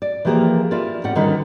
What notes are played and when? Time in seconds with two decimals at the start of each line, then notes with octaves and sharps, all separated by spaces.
0.02 D5
0.25 E3 F3 A#3 G4 G#4 A#4
0.71 E4 F4 A#4 D5
1.04 A2 C#4 G4 D5 F#5
1.15 D3 D#3 G3 C#4 A#4 B4